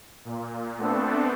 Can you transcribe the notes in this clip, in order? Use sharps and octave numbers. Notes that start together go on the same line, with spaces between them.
A#2
A3 B3 C4 D4 A4